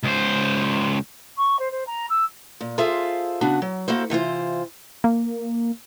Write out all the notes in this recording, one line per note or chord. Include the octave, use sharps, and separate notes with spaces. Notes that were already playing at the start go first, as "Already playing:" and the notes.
C#2 C5
C#6
C5
C5
A#5
E6
A#2
F4 G#4 A4 C5 E5 F5
C#3 B3 D4 F#4
F#3
A#3 E4 F#4 A4 C5
C3 E3 F4 C5
A#3